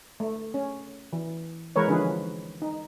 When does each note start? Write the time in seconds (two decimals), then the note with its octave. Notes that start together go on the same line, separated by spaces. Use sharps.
0.20 A3
0.54 C#4
1.13 E3
1.76 E3 G#3 A#4 B4 C#5
1.88 D3 F3 C#4 D#4 G#4 B4
2.62 D#4